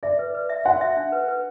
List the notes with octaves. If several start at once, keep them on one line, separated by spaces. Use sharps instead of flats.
D5 E5
B4
B4
E5
F#4 F#5
E5
D4
B4
B4